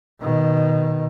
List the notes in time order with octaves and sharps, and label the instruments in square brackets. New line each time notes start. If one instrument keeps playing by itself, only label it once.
[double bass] B2 D#3